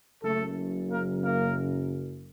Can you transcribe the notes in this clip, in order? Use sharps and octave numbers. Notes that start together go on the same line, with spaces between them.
F#1 F#2 C#3 A3 A4
A#3 A#4
A#3 A#4